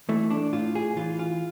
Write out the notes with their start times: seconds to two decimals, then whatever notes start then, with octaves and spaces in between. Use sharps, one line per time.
0.09 E3 A3
0.30 D4
0.53 A2 F4
0.75 G#4
0.97 E3 F4
1.19 F4